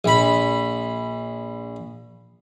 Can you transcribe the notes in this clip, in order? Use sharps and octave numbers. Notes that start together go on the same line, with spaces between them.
A#1 B5